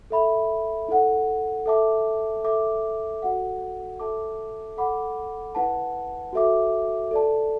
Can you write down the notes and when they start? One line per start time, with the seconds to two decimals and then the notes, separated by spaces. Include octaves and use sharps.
0.10 A4 E5 B5
0.88 E4 A4 F#5
1.66 A4 E5 A5 D6
2.44 A4 E5 D6
3.22 F#4 A4 F#5
4.00 A4 E5 A5 D6
4.77 A4 F#5 B5 D6
5.55 E4 B4 F#5 A5
6.33 F#4 A4 E5 D6
7.11 A4 D5 A5